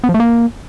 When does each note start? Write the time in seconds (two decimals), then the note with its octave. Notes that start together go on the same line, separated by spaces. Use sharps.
0.04 B3
0.09 F3
0.14 A3
0.20 A#3